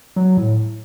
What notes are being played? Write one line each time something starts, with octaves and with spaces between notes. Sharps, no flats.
F#3
A2